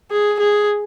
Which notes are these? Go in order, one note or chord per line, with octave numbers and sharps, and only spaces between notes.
G#4
G#4